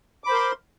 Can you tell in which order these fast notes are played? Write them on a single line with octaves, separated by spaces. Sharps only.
D6 B5 C5 A#4 C6